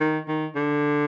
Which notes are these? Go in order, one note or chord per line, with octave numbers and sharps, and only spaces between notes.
D#3
D#3
D3